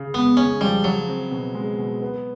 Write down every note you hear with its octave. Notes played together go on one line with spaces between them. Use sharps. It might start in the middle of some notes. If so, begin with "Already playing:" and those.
Already playing: C#3
G#3 B3
C#3 C#4
F3 G3
C#3 F#3
C4
B2
G#3
B2
B3